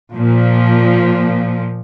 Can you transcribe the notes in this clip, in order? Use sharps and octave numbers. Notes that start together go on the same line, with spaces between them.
A#2 F3